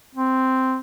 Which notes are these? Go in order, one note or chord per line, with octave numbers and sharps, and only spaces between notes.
C4